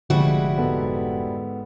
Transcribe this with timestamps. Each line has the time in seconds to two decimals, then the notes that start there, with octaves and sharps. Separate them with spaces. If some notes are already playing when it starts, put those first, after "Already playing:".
0.10 F1 F2 D3 F3 G3 G#3 E4 F#4
0.57 G#2 B3 A4